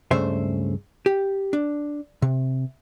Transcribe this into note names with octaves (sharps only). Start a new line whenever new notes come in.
C#2 G2 C#3 A3 C5 E5
G4
D4
C3